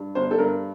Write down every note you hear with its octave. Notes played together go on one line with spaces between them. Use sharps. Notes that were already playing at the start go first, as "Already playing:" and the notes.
Already playing: G2
G1 C5
A4
G2 A#4